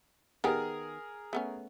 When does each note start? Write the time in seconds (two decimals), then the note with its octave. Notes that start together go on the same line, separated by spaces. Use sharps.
0.44 D#3 B3 G4 G#4 A#4
1.33 A3 B3 C#4